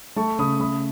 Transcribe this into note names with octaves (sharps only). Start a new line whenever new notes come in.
A3 A5 C#6
C#3 B5 D#6
A3 B5 D#6